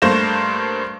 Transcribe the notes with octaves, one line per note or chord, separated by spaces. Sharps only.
G2 A3 A#3 C5 A#6 E7